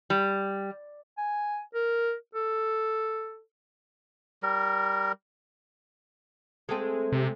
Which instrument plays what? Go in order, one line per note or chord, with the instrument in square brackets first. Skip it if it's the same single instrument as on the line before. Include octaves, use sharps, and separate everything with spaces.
[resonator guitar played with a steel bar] G3
[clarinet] G#5
A#4
A4
[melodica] G3 A#4
[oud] G#3 A3 C4
[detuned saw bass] C3